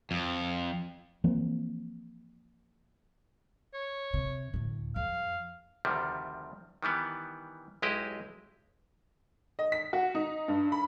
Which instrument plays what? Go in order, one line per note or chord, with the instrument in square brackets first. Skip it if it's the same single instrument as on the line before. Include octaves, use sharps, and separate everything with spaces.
[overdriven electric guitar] F2
[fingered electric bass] E3 F3 A#3 C4
[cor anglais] C#5
[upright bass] C3
D2 A2
[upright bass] F2 [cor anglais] F5
[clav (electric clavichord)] D2 C3 D#3 F3 G3
D#3 E3 G3 B3
B1 G#3 E4 G4 D#5
[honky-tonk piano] D#5
B6
F#4
D#4
G2
B5